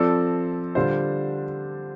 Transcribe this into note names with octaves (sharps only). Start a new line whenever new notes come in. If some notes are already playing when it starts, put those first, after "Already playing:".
Already playing: F3 C4 A4 D5
D3 G3 D4 F4 C5